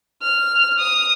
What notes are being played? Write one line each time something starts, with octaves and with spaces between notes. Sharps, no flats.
F6
D#6